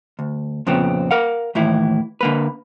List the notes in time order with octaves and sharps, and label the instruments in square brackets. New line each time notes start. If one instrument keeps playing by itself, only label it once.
[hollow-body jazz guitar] D2
F2 A#2 C#3 B3 C4
A#4 F5 F#5
D#2 A2 E3 E4
D3 A#3 B4